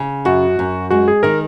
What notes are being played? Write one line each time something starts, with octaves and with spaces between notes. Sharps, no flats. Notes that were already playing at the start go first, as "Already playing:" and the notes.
Already playing: C#3
F#2 F#4
F#2
G#3 F#4
G#4
D#3 A#4